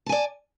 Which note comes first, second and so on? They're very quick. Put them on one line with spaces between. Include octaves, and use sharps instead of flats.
A5 G#5 D5